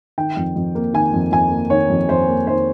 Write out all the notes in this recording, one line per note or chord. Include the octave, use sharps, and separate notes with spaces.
D#3 G5
F2
F2
A#3
D#3 G#5
F2
F2 G#5
A#3
D#3 C#5
F2
F2 C5
A#3
D#3 C5